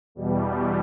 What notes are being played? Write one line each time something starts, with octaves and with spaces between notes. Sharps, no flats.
E2 B2 G3